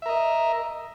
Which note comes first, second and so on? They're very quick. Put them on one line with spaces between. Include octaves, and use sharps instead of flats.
E5 A#4 D#5